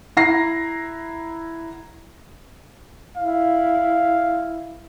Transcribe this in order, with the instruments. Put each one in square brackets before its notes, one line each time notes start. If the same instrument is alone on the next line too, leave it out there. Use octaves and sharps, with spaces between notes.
[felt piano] E4 F#5 A#5 A#6 C7
[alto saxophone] E4 [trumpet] F5